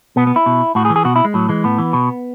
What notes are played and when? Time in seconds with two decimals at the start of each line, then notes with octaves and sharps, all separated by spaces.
0.16 B2 B3
0.27 B3
0.36 E4
0.46 B2
0.75 A2 F#4
0.85 G#4
0.90 E3
0.96 G#4
1.05 B2 F#4
1.16 E4
1.25 G#3
1.34 A2 F#3
1.49 E3 G#3
1.64 A2 B3
1.78 E3
1.93 B2